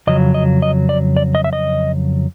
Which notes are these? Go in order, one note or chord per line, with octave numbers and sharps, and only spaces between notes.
F2 C#3 F#3 D#5
D#5
D#5
D5
D5
D#5
E5
D#5